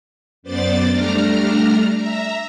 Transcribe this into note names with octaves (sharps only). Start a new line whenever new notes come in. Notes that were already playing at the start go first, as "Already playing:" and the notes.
F#2 B3 C5 D5 A6
G3 A3 D4 A#5 F6
E5 A#5